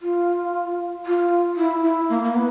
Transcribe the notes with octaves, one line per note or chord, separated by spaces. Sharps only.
F4
F4
E4
E4
A#3
A#3
B3